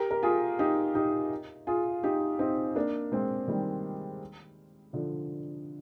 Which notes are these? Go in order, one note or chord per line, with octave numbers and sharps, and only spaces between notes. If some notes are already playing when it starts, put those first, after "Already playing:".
Already playing: G4 A#4
A#4
F4 G#4
D#4 G4
D#4 G4
F4 G#4
D#4 G4
C4 D#4
A#3 D4
G#3 C4
D#3 G3
D3 F3